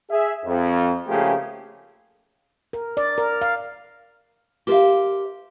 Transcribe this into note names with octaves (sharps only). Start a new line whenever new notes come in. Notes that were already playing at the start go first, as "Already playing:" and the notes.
G#4 E5
F2
C#3 F3 A3 A#3 G4 G#4
A#4
D5
A#4
F5
G4 A#4 C5 C#5 E5 F5